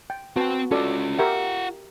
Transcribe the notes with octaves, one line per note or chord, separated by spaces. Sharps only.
G5
C4 F#4 B4 G5 A5
C#4 F4 F#4 A4 D5
F4 G4 A#4 E5 F#5